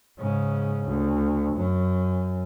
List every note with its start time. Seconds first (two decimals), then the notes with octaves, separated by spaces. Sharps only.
0.19 G#2 C#3
0.88 D2
1.56 F#2